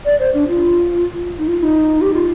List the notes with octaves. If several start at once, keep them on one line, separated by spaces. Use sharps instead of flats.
D5
C5
D4
F4
D#4
F4
F4
D#4
G4
F4